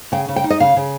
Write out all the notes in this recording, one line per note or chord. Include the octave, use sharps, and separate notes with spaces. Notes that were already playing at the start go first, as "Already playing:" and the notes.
C#3 G5
C#3
G5
D#4
D#5
C#3 F5
C#3